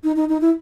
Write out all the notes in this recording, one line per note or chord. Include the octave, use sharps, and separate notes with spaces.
D#4
D#4
D#4
E4